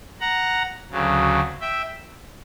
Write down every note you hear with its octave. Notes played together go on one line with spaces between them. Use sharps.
F#5 A#5
D2 C#3 F#3
E5 G5